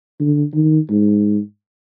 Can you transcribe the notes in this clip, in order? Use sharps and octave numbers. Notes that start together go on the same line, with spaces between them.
D3
D#3
G#2